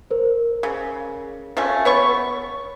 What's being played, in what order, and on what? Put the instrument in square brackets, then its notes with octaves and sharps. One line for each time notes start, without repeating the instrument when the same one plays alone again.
[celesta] A#4 C5
[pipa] C#3
F3 A3 C#4
B3 C#5 C#6